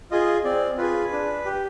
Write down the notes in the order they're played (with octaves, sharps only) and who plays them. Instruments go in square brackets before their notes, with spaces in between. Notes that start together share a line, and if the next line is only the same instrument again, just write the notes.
[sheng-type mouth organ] F4 G#4 D#5
C4 D5
F4 G#4 B4
D4
G4